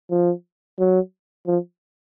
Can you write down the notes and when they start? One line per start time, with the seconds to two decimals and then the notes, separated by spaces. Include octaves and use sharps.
0.11 F3
0.79 F#3
1.47 F3